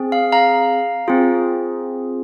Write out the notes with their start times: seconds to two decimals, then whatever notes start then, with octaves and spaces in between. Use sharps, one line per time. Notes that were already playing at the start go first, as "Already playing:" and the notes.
Already playing: C4 G#4
0.12 F5
0.32 F5 A#5
1.08 C4 F4 G#4